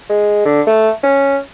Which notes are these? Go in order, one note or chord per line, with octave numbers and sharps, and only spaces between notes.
G#3
D3
A3
C#4